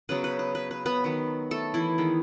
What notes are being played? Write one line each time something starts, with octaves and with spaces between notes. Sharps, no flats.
C#3 F#3 B3 B4
B4
B4
B4
B4
B3 B4
D#3 F#3 B3
A3 A4
E3 E4
D#3 G#3 B3